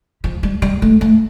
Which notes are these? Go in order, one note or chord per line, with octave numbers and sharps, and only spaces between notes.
F3
G3
G3
A3
A3